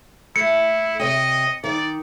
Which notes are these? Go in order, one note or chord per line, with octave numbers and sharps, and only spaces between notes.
A3 E4 C#7
C3 C#5 D#5 G5
D#3 D5